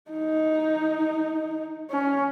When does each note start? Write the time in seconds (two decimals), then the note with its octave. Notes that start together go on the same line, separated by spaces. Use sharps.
0.11 D#4
1.90 C#4